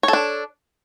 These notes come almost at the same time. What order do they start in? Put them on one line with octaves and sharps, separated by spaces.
C#5 A4 D4